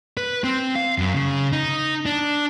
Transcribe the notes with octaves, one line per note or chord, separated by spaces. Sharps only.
B4
C4
F5
F#2
C#3
D#4
D4